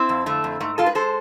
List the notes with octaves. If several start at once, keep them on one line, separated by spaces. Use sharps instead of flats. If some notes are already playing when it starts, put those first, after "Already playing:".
Already playing: C4 E4
F2
D3 A3
F2
G#2 A3
G#3 F4 A4
G#4 B4
G#3 A4 C5